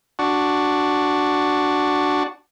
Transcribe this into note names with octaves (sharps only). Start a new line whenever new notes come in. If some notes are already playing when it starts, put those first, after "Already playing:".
D4 F#4